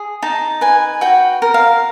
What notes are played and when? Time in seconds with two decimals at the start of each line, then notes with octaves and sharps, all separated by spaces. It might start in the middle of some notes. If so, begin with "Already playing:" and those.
Already playing: G#4
0.22 D#4 A5
0.61 B4 G#5
1.01 F#4 G5
1.42 A#4
1.54 F5